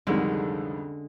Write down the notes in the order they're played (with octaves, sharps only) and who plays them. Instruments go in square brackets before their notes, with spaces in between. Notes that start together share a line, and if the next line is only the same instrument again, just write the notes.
[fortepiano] C2 F2 D#3 [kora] D3 G#3 C#4